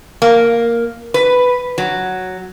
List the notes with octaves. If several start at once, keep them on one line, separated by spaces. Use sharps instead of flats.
A#3
B4
F#3